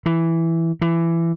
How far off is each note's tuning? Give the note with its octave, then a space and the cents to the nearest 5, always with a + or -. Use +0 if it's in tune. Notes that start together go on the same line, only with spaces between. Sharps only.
E3 +0
E3 +20